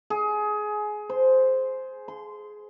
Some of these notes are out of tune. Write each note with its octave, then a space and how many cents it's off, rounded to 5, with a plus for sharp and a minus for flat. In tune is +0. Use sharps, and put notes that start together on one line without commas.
G#4 +20
C5 -5
C6 -15